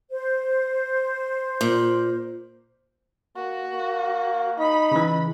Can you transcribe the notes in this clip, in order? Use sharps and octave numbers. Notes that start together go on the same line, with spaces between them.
C5
A#2
A#3 F#4
A#3
D#4 B5
C#3 E3